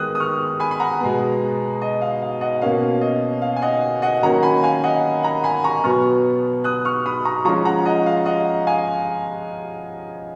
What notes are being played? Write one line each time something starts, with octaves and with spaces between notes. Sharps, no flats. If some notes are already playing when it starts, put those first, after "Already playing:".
Already playing: D#3 G#3 B3 D#6 F#6
D#6
C#6 F6
G#5 B5
B5
F#5 A#5
B2 G#3 B3
D#5
F5
F5
D#5 F#5
B2 A#3 C#4 F5
D#5
F5
G#5
D#5 F#5
D#5 F#5
D#3 F#3 A#3 C#4 F#5 A#5
G#5 B5
F5 G#5
D#5 F#5
F#5 A#5
G#5 B5
A#5 C#6
B2 F#3 B3 C#6 F6
D#6 F#6
C#6 F6
B5 D#6
A#5 C#6
F3 G#3 C#4 A#5 C#6
F#5 A#5
D#5 F#5
F5
D#5 F#5
F5 G#5